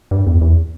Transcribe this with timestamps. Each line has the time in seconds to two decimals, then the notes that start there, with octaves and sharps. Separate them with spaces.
0.11 G2
0.27 E2
0.41 E2